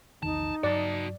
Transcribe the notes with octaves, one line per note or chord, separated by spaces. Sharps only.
A#1 E2 D#3 D#4 A5
G2 F#3 F#4 D5 A5